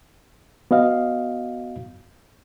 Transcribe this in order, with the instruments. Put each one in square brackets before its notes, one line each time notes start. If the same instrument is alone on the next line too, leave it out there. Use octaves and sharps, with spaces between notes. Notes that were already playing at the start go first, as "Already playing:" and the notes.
[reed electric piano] B3 F#4 D#5 F5